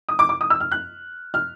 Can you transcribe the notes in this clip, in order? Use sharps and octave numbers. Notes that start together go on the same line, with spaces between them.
D#6
D6
D6
D#6
E6
F6
F#6
F6